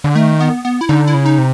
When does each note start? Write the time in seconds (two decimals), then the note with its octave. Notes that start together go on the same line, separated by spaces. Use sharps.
0.04 D3
0.15 D#3 A3
0.40 B3
0.65 B3
0.81 E4
0.89 D3 D#4
1.08 E4
1.14 C#3
1.26 D#4
1.38 C3